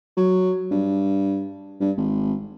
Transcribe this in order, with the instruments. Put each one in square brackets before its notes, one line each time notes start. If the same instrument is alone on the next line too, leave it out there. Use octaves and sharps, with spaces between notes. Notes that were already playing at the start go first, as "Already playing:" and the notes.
[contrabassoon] F#3
G2
G2
G#1